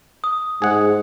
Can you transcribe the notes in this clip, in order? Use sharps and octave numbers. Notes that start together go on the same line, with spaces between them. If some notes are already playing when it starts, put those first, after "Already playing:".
D#6
G#2 G#4 F#5